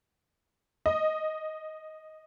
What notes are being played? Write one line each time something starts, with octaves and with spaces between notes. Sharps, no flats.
D#5